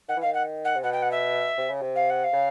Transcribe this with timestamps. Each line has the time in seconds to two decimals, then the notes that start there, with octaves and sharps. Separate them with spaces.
0.08 D#3 F#5
0.17 E3
0.22 D#3 F5
0.34 F#5
0.65 F#5
0.76 C3
0.83 B2 F#5
0.93 G5
1.02 F#5
1.11 E5
1.58 C3
1.70 C#3
1.82 C3
1.96 F5
2.10 F#5
2.24 F5
2.33 C#3